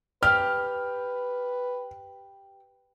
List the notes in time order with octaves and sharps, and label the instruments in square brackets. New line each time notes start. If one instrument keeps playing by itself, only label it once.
[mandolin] G4 [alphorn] B4 [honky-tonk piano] F6